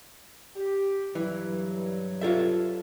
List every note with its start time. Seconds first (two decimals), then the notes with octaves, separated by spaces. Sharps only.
0.55 G4
1.15 G2 E3 F#3
2.21 F4 A4 E5